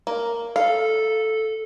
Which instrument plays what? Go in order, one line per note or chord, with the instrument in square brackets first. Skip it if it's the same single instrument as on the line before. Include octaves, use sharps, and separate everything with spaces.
[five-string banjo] A#3
[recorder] A4 [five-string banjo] F5